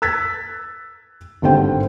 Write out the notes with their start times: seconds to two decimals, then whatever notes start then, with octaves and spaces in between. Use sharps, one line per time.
0.02 E6 F#6 G#6 A6 B6
1.42 G#1 G2 D3 C5 G5